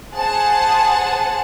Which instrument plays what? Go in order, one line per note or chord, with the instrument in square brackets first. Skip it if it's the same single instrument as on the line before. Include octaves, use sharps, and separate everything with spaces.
[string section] G#4 C5 F#5 A5